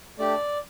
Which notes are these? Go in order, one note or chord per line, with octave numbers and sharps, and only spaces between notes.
A3 D4 G4 D5